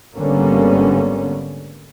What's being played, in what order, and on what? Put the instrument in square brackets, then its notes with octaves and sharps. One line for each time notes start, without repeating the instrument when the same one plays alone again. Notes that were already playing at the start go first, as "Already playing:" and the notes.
[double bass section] G#1 D3 G3 A#3 B3 C#4